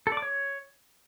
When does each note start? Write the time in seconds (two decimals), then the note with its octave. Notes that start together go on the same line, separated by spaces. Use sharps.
0.07 A4
0.12 D5
0.17 D6
0.22 C#5